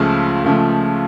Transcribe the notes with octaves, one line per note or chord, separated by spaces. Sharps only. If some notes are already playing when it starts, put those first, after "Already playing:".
Already playing: C#2 C#3 F3 A3
C#2 C#3 F3 A3